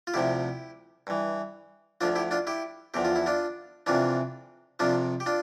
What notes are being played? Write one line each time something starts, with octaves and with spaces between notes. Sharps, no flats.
F4
D2 C3 F3 E4 G4
G2 E3
D2 D3 F3 D4 F4
E4 G4
D4 F4
E4 G4
E2 D3 F3 G4
F4
E4
D4 F4
F2 C3 E3 D4 F4
F2 C3 F3 D4 F4
G4
D4 F4